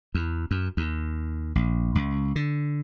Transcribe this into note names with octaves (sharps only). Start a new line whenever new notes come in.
E2
F#2
D#2
A#1
C#2
D3